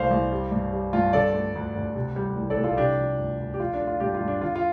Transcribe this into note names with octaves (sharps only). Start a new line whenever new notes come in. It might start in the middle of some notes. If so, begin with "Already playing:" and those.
Already playing: C2 C3 A3 C5 F5
C2
G3
G2
G3
G2 F4
D3 A4 D5
A3
D2
D2
C3
G3
C2
A4 D5
C2
F4 A4
C3 D4 G4
F3
D2
D2
G4
F3 F4
D4
A3
F4
G2 D4 G4
F4
G2
D4
D3 F4
F4